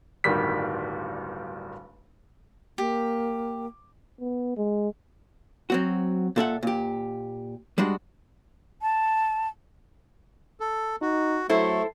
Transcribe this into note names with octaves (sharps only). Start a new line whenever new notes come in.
D1 G1 D#3 G3 B6
A#3 G4
B3
G#3
F#3 C4 F#4
A#2 A4 E5 F#5
A#2 G4
G3 G#3 D4 F#4
A5
A4
D#4 F#4
F#3 A3 E4 A4 C5